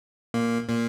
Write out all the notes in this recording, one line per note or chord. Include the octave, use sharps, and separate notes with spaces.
A#2 A#3
A#2 A#3